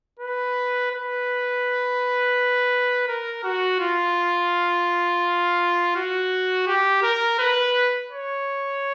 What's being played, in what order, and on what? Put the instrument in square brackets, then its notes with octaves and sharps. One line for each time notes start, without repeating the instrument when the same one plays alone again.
[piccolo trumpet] B4
B4
A#4
F#4
F4
F#4
G4
A#4
B4
C#5